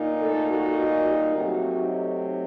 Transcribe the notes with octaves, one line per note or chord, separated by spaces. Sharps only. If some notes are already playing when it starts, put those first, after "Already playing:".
Already playing: A#2 D#4
A3 A4
F#4
F#4
G3 G4
C3 F#3 A3 F#4
D#4